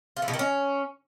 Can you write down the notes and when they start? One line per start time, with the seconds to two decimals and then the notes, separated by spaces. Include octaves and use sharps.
0.17 F4
0.22 E3
0.28 B2
0.33 D#3
0.39 C#4